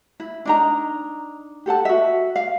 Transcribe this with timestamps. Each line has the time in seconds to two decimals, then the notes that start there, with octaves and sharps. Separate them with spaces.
0.20 E4
0.45 D4 D#4 A#5
1.66 G4 A4 F#5 A5
1.85 F#4 E5
2.36 F5